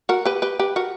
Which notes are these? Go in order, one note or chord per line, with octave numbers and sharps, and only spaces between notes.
F#4 A#4
G4 B4
G4 B4
G4 B4
F#4 A#4